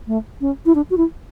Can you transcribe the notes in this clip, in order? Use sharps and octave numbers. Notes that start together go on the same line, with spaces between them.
A3
C#4
E4
D4
F#4
E4